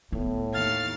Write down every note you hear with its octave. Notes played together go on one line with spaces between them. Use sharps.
A2 B3
D#2 F5 A6